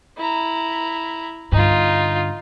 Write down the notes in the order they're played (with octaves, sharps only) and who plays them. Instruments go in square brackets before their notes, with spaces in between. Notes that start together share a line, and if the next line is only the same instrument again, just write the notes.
[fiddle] E4 A#5
[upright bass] G2 D3 [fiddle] D#4 F4